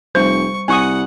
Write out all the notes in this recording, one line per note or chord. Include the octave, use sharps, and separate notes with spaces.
F1 G3 C5 C#6
C2 F#5 G#5 C#6 D#6